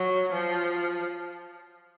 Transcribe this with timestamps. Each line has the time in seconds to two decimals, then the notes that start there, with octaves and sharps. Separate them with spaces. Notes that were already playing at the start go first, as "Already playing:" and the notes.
Already playing: F#3
0.32 F3